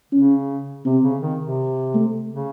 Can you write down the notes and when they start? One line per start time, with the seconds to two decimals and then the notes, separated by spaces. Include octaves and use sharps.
0.12 C#3 C#4
0.85 C3 C4
1.03 C#3
1.21 D#3
1.40 C3
1.95 A3
2.31 C#3